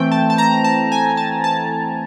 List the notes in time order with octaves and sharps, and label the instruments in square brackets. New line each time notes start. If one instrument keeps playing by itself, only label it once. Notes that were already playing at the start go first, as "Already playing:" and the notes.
Already playing: [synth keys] E3 A3 C4 G5
A5
A5
A#5
A5
G#5
A5
A5